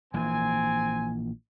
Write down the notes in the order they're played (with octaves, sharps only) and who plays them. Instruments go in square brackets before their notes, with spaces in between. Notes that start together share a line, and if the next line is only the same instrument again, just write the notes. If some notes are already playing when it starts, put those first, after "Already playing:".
[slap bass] A#1 E3 A#3 [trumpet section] C4 G#5